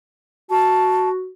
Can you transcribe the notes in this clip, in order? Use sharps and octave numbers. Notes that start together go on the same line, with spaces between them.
F#4 A5